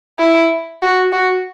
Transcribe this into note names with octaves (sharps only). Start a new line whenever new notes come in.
E4
F#4
F#4